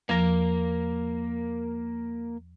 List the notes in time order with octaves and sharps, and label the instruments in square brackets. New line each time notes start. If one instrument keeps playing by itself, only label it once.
[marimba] E2 F3 A#6 [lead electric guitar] A#3 A#4